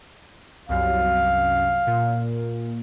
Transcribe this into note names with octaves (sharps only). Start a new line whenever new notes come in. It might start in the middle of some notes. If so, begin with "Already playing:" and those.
C2 F#2 F5
A#2